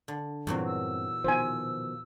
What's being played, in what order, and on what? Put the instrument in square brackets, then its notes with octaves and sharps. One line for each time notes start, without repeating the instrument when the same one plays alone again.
[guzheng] D3
[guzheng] E2 A#2 F#3 [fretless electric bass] G2 C4
[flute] E6
[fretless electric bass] B2 D#3 F3 [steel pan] C5 G#5